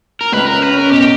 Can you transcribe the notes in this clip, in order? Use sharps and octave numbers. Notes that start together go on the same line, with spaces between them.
A#4
C#2 B4
A#4
C#4
B4
C#4
A#4
B2 G4